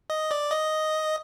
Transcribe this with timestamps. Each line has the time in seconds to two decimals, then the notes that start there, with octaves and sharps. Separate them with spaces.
0.10 D#5
0.31 D5
0.51 D#5